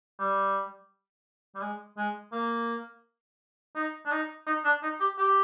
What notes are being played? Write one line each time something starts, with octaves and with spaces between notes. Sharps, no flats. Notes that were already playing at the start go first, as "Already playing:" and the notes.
G3
G3
G#3
G#3
A#3
D#4
D4
D#4
D#4
D4
D#4
G4
G4